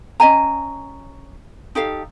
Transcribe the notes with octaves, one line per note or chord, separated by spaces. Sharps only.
C#4 D#5 G#5 A#5
D#4 G4 A4 F5